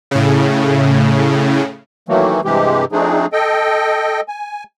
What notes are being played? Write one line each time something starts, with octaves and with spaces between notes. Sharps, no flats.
A2 C#3
D#3 E3 F#3 A3 A#3
G2 C3 E3 G#3 G4
F3 A3 C4 D4 D#4 G#4
A4 D#5 G5
G#5